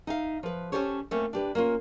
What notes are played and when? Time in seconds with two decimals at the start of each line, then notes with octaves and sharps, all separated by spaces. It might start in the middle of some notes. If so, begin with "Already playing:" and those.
0.07 D#4 E5 F5
0.43 F3 B4
0.72 C#4 D#4 G4 A4 C5 C#5
1.11 A3 A#3 C4 C#4
1.33 D4 G4 B4
1.55 A#3 C#4 F4